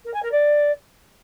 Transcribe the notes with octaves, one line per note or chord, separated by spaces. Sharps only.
A#4
G#5
A#4
D5